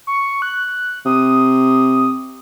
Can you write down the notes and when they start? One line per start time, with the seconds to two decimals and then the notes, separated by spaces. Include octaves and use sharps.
0.07 C#6
0.42 F#6
1.06 C3 D#6